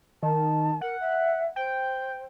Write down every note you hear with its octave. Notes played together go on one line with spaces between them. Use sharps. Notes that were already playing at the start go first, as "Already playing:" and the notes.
D#3 A5
A#4 F#5
E5
C5 G5